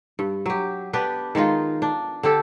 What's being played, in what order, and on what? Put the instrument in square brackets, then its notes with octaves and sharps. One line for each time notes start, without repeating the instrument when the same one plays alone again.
[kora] G2
F#3 G4
B3 D4 G4 B4
D#3 G#3 D#4 F4
D4
D3 G4 A4